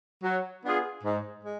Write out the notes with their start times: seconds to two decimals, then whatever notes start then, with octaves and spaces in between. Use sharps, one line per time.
0.23 F#3
0.64 B3 D4 F4 G#4
1.04 G#2
1.44 G#3